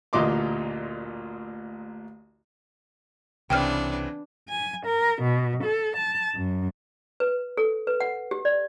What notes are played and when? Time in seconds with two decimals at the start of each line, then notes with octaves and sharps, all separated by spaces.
0.13 A1 D2 A#2 D#5 C6 D6
3.50 C2 C#3 E3 B3 C4 D4 G5 F6
4.48 G#5
4.85 A#4
5.22 B2
5.63 A4
5.96 A5
6.36 F#2
7.20 B4
7.57 A4
7.87 B4
8.00 F#5
8.31 G4
8.45 D5